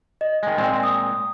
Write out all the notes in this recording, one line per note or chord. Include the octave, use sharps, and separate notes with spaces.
D#5
D#3 G#3
A#2 G#3 C4
D#6